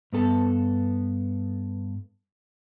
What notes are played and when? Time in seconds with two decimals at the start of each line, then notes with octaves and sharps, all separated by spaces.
0.13 G2 B3 A4 A5